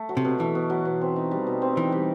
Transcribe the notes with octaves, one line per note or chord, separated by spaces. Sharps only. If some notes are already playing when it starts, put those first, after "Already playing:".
Already playing: A3
F#3
C3
B2
E3 A3
B2
F#3
B2
C4
D#4
G3
B2
C4
E3 D#4
G3